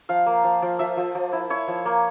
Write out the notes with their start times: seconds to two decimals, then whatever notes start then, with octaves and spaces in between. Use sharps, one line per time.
0.09 F3 F5
0.26 A#3
0.44 F3
0.62 F3
0.79 F3 E5
0.97 F3
1.15 F3
1.33 E4
1.50 E4 C#5
1.68 F3
1.86 A#3